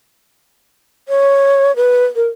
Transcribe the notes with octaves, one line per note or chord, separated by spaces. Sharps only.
C#5
B4
A#4